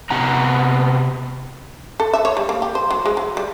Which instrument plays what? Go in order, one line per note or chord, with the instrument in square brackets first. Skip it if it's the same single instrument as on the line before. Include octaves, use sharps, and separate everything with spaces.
[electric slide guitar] C3 B3 F#5 A#5
[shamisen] A4
E5
C#5
G3
A#3
G4
C5
F#3
G#3
F#3
G3